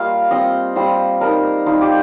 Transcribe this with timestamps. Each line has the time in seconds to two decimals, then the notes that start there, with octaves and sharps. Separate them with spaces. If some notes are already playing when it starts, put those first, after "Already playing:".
Already playing: G3 A#3 F4 A#4 D#5 F5
0.31 G3 C4 F4 D#5
0.76 G3 C4 F4 C5
1.21 G3 D#4 A#4
1.66 G3 D#4 F4
1.81 G4